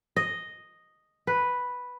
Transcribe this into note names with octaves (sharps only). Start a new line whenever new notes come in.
D#5
B4